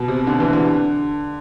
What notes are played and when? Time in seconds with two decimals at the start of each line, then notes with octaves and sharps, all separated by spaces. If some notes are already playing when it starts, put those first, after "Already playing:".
Already playing: B2
0.08 C3
0.27 D3
0.40 E3
0.53 D3